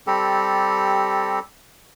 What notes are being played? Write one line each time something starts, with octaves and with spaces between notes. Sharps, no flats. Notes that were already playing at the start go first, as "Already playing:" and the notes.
G3 C4 G4 A4